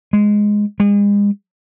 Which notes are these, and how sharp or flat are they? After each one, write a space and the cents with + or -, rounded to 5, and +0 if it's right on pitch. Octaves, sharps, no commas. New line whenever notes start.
G#3 +0
G#3 -35